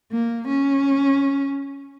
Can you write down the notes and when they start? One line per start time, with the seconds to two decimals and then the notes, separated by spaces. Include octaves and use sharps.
0.12 A#3
0.48 C#4